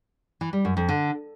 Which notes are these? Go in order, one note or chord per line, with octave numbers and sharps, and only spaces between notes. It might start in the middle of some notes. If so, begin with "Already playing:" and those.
E3
G3
F#2
F2
D3